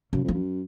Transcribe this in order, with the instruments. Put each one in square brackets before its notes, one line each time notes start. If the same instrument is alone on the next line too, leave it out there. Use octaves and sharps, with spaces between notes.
[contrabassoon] F#2 [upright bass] C#3
[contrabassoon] F2 [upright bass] F3
[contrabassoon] F#2